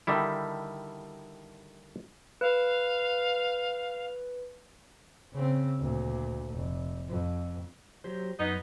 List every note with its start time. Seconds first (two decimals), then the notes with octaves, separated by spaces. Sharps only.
0.07 D3 D#3 G3 E4
2.41 B4 F5
5.32 C#3 C4
5.79 D2 A#2
6.54 F1
7.08 F2
8.04 F#3 G4 C5
8.39 F#2 B3 D#4